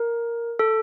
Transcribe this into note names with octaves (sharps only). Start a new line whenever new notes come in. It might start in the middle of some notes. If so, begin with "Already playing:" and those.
Already playing: A#4
A4